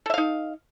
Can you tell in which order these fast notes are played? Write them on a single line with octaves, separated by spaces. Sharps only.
A4 E5 F5 D#4